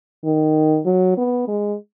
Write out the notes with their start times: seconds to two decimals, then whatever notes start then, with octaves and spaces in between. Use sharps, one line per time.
0.24 D#3
0.86 F#3
1.18 B3
1.48 G#3